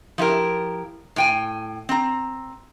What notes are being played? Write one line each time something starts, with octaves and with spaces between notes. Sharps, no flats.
F3 E4 G4 A#4
A2 G5 G#5
C4 A#5